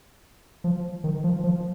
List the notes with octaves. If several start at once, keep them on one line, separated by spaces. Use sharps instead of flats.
F3
D#3
F3
F3